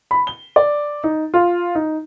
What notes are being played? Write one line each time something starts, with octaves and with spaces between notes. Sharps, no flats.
B5
G7
D5
D#4
F4
D#4